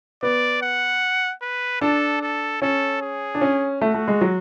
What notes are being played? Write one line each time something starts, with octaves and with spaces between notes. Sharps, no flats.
B3 D5
F#5
B4
D4 A4
A4
C#4 A4
G#4
D4
C#4
A3 F#4
A3
G#3
F#3